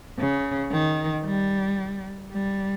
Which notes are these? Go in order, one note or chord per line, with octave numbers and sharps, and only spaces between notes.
C#3
D#3
G3
G3